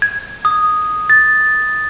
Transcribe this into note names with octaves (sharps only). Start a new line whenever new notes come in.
G#6
D#6
A6